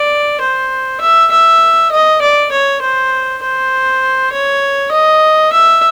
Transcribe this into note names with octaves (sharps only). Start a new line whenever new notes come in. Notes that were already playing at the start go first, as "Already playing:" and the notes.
Already playing: D5
C5
E5
E5
D#5
D5
C#5
C5
C5
C#5
D#5
E5